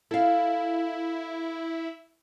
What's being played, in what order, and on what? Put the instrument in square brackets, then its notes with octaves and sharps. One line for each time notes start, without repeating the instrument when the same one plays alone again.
[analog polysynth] E4 [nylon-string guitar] A4 F5